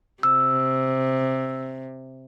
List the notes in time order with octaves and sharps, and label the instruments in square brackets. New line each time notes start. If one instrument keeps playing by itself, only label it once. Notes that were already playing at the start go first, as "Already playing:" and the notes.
[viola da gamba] C3 [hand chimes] E6